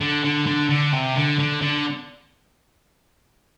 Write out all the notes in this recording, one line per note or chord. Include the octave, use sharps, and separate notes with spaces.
D3
D3
D3
D3
C3
D3
D3
D3